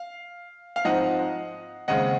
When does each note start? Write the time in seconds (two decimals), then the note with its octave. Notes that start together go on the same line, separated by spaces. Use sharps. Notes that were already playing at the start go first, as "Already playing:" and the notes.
Already playing: F5
0.76 F5
0.84 G#2 F3 C4 D#4 D#5 F#5
1.88 D#2 C#3 G#3 C4 D#5 F#5